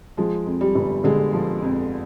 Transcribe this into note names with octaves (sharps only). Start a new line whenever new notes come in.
F3 G#3
F2
G3
G1
D3 G#3
F3
F2